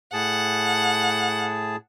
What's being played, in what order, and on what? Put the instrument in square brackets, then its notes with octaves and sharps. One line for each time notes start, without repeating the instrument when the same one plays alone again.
[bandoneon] A2 G#4 A5 [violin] F#5